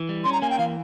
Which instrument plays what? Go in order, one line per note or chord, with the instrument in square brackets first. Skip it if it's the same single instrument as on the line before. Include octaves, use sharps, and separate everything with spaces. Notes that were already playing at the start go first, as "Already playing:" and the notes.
Already playing: [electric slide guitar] E3
G3
[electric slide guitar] C#4 [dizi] C6
[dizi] A#5
[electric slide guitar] A#3 [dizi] G#5
[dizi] G5
[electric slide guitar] E3 [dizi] F5